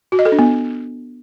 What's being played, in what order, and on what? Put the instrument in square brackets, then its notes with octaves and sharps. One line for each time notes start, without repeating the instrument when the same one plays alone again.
[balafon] F#4
D#5
A4
D4
B3